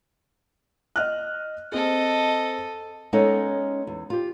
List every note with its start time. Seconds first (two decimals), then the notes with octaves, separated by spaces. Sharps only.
0.96 D#5 F6 F#6
1.72 C4 G#4 A4 D#5
3.13 G#3 B3 C#4 D#4 A4 C#5
3.87 E2
4.10 F4 G4